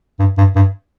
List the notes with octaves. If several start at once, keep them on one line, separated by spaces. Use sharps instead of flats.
G2
G2
G2